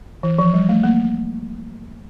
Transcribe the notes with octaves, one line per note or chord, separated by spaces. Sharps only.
E3
F3
G3
A3
A#3